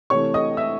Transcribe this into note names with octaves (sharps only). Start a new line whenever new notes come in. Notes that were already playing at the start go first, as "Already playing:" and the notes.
C3 E3 A3 C#5 C#6
D#5 D#6
E5 E6